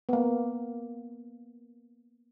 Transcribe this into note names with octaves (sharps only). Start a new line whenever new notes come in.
A#3 B3